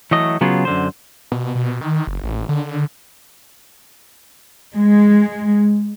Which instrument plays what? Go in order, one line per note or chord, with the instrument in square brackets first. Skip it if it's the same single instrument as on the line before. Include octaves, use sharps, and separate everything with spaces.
[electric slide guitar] E3 F#3 A3 D#5
C#3 F#3 B3 F4 G#4
F#2 D3 C5
[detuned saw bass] B2
B2
D#3
F#1
A1
D3
[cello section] G#3